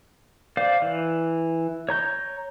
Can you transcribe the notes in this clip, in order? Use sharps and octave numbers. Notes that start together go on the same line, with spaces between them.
C5 D5 F5
E3
C#5 A#5 G6